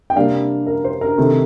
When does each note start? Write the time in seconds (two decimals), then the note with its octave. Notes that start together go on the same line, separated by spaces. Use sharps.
0.10 G5
0.16 C3 G3 A#3 D4 F5
0.67 A#4
0.84 C5
1.01 A#4
1.18 C3 D#3 A3 C4